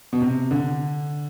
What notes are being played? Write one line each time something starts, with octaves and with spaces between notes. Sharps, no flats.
B2
C3
D3